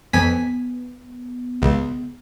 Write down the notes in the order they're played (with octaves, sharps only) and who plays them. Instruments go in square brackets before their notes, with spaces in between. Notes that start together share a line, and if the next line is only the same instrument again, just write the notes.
[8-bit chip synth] F2 G#5 B6 [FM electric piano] B3
[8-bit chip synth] C#2